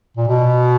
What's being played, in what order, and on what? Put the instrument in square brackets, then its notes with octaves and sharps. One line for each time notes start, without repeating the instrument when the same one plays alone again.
[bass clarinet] A#2
B2